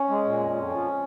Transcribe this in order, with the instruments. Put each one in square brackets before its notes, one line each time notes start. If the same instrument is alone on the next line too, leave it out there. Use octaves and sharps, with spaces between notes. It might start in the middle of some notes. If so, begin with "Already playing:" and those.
Already playing: [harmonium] C#4
G#3
A#2
F2
F2
F3